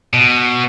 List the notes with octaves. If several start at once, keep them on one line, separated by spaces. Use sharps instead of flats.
B2